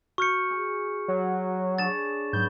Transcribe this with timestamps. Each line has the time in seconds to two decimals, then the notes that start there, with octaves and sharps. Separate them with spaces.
0.18 F#4 C#6 F6 G6 C#7
0.51 G#4
1.08 F#3
1.78 D4 G#4 C#5 A6 E7
2.33 G#2 F#3 B3 G6